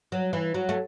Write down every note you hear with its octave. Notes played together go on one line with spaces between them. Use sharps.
F#3
E3
F#3
A3